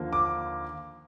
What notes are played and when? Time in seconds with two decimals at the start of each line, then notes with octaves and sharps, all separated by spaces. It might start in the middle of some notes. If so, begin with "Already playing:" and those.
Already playing: D#2 D3 F3 A#3
0.13 D6